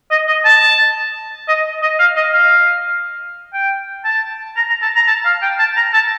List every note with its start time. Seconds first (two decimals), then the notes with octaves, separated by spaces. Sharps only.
0.11 D#5
0.27 D#5
0.45 A5
1.48 D#5
1.82 D#5
1.99 F5
2.16 D#5
2.33 F5
3.53 G5
4.05 A5
4.56 A#5
4.69 A#5
4.82 A5
4.95 A#5
5.07 A5
5.25 F5
5.42 G5
5.59 A5
5.76 A#5
5.93 A5